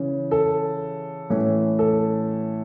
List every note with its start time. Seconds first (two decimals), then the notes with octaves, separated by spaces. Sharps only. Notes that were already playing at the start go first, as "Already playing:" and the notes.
Already playing: C#3 E3 C#4
0.31 A4
1.30 A2 E3 C#4
1.79 A4